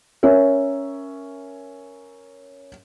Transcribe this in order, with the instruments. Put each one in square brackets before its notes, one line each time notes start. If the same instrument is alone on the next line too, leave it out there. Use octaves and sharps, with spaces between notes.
[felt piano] C#4 A#4 C#5 E5